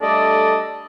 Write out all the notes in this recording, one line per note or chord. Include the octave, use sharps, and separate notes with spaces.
G3 A3 D4 A4 D5 D#5